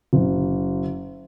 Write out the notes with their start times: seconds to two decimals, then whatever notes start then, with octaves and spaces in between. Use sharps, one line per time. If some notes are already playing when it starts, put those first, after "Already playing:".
0.13 F#1